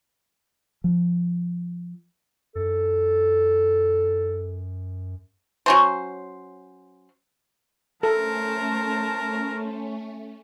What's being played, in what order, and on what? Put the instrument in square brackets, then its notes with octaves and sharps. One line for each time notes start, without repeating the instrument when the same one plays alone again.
[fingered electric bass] F3
[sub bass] F#2 [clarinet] A4
[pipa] F#3 C#4 C5
[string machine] A3 C#4 [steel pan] A4 [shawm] A#4 [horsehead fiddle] C5 A5